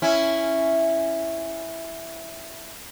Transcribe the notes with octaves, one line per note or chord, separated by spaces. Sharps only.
C#4 E4